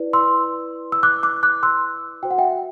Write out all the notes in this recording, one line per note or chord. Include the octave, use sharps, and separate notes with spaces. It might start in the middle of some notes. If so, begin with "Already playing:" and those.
Already playing: E4 B4 D5
C6 E6
E6
D6 F#6
D6 F#6
D6 F#6
C6 E6
F#4 C5 G5
F#5
E5 G5